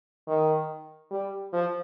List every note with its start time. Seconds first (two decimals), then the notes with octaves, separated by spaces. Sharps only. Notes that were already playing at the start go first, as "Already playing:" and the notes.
0.28 D#3
1.11 G3
1.53 F3